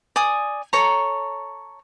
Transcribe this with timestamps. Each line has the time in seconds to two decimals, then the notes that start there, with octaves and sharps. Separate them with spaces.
0.16 D5 G#5 D#6
0.73 A4 C#5 A#5